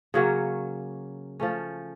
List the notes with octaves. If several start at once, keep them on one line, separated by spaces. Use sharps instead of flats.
C#3 F#3 A#3 C#4
F3 A3 C#4